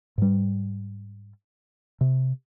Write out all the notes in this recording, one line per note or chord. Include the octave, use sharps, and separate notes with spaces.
G#2 G3
C3